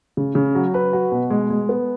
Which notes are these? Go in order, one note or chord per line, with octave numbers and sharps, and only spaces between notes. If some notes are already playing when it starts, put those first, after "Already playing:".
C#3
C#3
F#3
B4
F#4
B2
G#3
G#3
B3